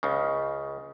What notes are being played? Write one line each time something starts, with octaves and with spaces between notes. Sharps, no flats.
C#2 C#3